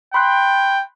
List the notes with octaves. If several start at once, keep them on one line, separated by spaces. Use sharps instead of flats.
G5 B5 C6 F#6